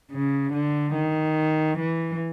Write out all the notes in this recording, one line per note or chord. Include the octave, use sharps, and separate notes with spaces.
C#3
D3
D#3
E3